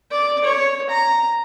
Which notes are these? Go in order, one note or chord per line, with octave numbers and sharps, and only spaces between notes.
D5
C#5
A#5